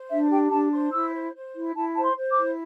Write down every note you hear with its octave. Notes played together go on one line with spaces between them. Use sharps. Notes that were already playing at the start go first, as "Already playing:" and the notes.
Already playing: C5
D4 E5
G4 G5
D4 A5
C5 C6
E4 E6
C5
C5
E4
E4 A5
C5 A5
C6
C5
D6
E4